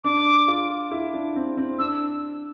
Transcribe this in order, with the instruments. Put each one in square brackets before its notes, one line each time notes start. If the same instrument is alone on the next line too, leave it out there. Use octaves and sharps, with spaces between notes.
[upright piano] D4 [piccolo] D6
[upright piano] F4
E4
D4
C4
C4
[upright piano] D4 [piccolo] E6